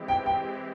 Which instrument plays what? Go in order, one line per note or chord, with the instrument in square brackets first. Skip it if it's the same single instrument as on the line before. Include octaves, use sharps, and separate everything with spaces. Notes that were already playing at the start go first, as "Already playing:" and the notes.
Already playing: [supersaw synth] E3 G#3 C4 G4
[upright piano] G5
G5